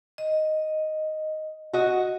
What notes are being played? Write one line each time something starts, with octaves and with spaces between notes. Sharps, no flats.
D#5
F#4 D#5